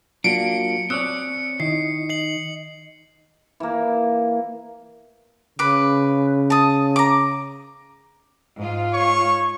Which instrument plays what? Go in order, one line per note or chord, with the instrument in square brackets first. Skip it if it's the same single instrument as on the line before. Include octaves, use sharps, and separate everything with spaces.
[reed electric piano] F#3 F4 F#4 [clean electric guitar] A#3 D4 [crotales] C#7 [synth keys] D7
[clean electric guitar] C4 C#5 D5 [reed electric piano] D#6 E6 F#6 [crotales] C#7
[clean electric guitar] D#3 [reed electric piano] E4 D#5 [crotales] C7
[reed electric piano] D#5 [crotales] C7 F#7
[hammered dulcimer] E3 A#3
[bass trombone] C#3 [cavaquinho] B4 D6
[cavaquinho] A5 D#6
A#5 D6
[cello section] G#2 F4
[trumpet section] C#5 C#6